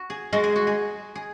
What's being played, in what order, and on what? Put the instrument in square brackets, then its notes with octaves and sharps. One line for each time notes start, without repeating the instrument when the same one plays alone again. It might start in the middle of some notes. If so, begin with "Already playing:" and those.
Already playing: [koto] F#4
G#4
[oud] G#3 [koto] F#4
[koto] G#4
F#4
G#4
G#4